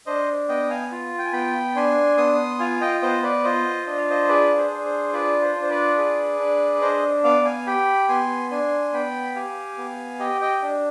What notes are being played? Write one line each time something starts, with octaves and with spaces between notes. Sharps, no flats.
D4 C5 D#5
B3 D#5 G5
F5 G#5
F4
G5
G#5
B3 G5 B5
D4 G#5 C6
B3 C6 D#6
F4 F5 G#5
D#5 G5
B3 C5 D#5
B4 D5
F4 C5 D#5
D4 D#5
F5
C5 D#5
G#4 B4 D5
C5
D4
C5
F4 B4 D5
C5
D4
C5
B4 D5
G#4
D4
D4 C5 D#5
B3 D5 F5
F5 G#5
G4 G5 B5
B3 G#5 C6
D4 G#5 C6
B3 G5 B5
G4 F5 G#5
B3
G4 D#5 G5
D#5 G5
D4